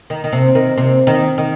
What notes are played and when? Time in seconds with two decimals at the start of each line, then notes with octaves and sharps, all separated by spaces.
0.10 D#3
0.24 D#3
0.33 C3
0.55 D#3
0.78 C3
1.07 D#3
1.38 D#3